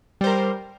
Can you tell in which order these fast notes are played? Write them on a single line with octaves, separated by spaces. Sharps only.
G3 C5 A#4